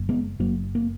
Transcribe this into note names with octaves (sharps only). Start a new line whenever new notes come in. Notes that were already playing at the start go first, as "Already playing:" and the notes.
Already playing: F#1
G#3 B3
F#1 F#3 A#3
A#3